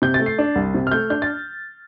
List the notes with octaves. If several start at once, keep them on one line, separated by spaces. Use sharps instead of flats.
C3 G6
A6
A3
C7
D4
C2
C3
F6
A3 G6
D4 G6
A6